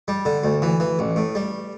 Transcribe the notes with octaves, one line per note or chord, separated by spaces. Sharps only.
G3
D3
D2
E3
E3
A1
A2
G3